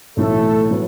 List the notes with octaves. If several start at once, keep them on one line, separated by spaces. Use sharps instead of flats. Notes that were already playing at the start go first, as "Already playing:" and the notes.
B1 A2 E3 A3 A4
A2 F#3 B3